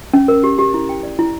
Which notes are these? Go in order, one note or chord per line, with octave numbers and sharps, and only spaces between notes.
C#4
A#4
G4
G4
E4
G5
D5
E4